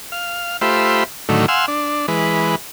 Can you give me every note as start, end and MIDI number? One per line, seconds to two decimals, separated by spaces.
0.12 0.57 77
0.61 1.04 57
0.61 1.04 65
0.61 1.04 67
0.61 1.04 72
0.61 1.04 76
0.61 1.04 83
1.29 1.46 45
1.29 1.46 50
1.29 1.46 51
1.29 1.46 54
1.29 1.46 57
1.48 1.66 77
1.48 1.66 78
1.48 1.66 80
1.48 1.66 84
1.48 1.66 88
1.68 2.06 62
2.08 2.55 52
2.08 2.55 56
2.08 2.55 71